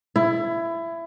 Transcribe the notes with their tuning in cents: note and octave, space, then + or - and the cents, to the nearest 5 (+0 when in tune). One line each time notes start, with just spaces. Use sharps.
E4 +20